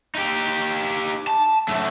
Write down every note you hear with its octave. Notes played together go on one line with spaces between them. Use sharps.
D#4 G4
A5
F#2 A3